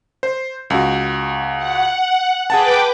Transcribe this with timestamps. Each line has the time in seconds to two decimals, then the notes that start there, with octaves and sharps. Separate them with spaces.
0.23 C5
0.70 C#2 F#4
1.58 F#5
2.50 G#4 B4 F#5 G5 A5 D6